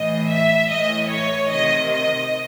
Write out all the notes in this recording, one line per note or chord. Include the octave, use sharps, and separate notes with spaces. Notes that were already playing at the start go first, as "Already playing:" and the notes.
Already playing: A2 E3 D#5
E5
A2 E3 D#5
C#5
C3 D#3 D#5
D#5